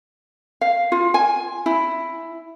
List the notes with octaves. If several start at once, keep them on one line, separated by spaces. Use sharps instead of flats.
F5
F4
G#5
E4